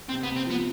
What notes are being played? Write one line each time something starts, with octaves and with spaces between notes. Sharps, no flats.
C3 C4
B3
C3
C4
F3 B3